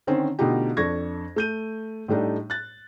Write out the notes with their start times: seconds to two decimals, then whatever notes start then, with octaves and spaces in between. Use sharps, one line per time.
0.07 D3 D#3 C4 C#4 C5
0.39 B2 D3 A3 D#4 F4 G4
0.77 F2 D4 A4 C#6 G#6 A#6
1.36 A3 G6 D#7
2.08 A2 G3 A3 D4 D#4
2.50 F#6 A6